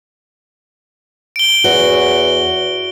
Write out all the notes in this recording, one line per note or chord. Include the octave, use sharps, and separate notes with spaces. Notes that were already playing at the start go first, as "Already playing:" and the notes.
D7 G7
E2 F#4 C#5